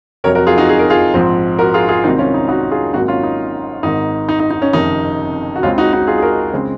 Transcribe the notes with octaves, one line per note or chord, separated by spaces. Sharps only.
F1 F2 C3 F#3 A#4 C#5
F#4 A#4
F4 G#4
D#4 F#4
G#4
A#4
F4 G#4
A#1 G#2 F3 C4
F#4 A#4
F4 G#4
F4 G#4
C2 C3 D#3 G#3 C4 D#4 F#4
C#4 F4
D#4
D#4 F#4
F4 G#4
G#1 G#2 F#3 A#3 D#4 F#4
C#4 F4
D#4
G#1 G#2 D#3 D#4
D#4
D#4
D#4
C#4
F#1 F2 C3 D#3 D#4
F#4
C#2 C#3 G#3 C4 C#4 F4
D#4 F#4
D#4 F#4
F4 G#4
G#4
F#4 A#4
C#3 G#3 C4